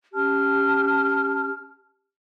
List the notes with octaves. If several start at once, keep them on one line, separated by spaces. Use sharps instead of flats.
C#4 G4 A5 F6